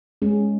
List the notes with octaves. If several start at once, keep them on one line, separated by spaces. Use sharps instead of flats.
G#3 C#4 G#4